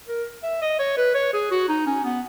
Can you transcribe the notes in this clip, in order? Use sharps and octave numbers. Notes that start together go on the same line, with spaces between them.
A#4
E5
D#5
C#5
B4
C#5
G#4
F#4
D#4
C#4
B3